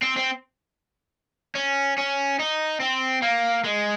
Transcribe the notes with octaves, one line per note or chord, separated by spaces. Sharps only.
C4
C4
C#4
C#4
D#4
C4
A#3
G#3